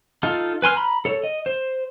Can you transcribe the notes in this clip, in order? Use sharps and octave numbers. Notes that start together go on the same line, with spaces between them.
D#4 F4 A4
B4 G#5 C6 F6
A#5 B5
A4 C#5
D#5
C5